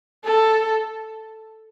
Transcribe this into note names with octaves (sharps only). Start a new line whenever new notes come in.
A4